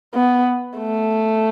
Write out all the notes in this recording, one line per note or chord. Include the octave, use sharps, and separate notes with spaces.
B3
A3